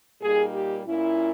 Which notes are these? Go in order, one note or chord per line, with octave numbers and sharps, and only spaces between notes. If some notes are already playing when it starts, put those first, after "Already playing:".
A#2 G3 A#3 D#4 G#4
G4
A#2 A#3 C#4 E4